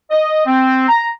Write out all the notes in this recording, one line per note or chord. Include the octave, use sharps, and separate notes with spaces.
D#5
C4
A#5